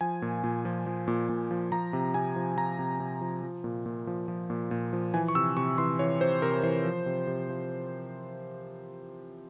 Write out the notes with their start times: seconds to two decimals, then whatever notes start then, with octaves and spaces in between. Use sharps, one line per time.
0.01 F3 G#5
0.22 A#2
0.44 A#2
0.65 F3
0.86 F3
1.08 A#2
1.29 A#2
1.51 F3
1.72 F3 A#5
1.93 C3
2.14 C3 G#5
2.36 F3
2.57 F3 A#5
2.79 C3
3.00 C3
3.21 F3
3.43 F3
3.64 A#2
3.86 A#2
4.07 F3
4.28 F3
4.50 A#2
4.71 A#2
4.93 F3
5.14 E3 G#5
5.28 C#6
5.35 C3 E6
5.57 C3 C#6
5.78 E3 C6
5.99 E3 C#5
6.21 C3 C5
6.42 C3 A#4
6.63 E3 C5
6.85 F3
7.06 C3
7.27 C3
7.49 F3